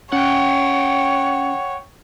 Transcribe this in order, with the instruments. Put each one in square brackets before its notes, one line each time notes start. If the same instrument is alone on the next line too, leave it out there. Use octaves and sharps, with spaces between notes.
[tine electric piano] C#4 [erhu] C#5 [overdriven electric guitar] F#5 G5